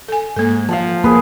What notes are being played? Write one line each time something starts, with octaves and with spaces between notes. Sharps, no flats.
A4 G#5
G#2 A#3 A4
F3 F5 F#5 A5
A#3 G#4 B4